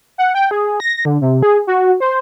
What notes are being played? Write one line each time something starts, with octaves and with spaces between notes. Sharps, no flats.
F#5
G5
G#4
A#6
D3
C3
G#4
F#4
C5